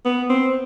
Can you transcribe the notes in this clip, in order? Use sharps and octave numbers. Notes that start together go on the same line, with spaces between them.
B3
C4